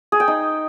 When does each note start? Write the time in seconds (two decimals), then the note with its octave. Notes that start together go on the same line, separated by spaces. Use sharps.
0.12 G#4
0.20 G5
0.28 D#4